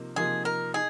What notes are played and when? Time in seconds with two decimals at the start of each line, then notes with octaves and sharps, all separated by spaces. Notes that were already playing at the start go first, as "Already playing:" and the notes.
Already playing: C3 F3 A#3 D#4
0.16 C3 F3 A#3 D#4 G#4
0.45 A#4
0.74 D#4 G#4